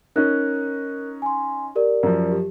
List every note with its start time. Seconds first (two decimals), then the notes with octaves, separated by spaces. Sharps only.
0.16 C#4 D#4 A#4 F#6
1.22 G#5 C6
1.75 G4 A#4 D5
2.03 F#2 F3
2.32 G4